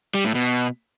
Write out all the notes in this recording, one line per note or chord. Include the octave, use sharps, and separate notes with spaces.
G3
A2
B2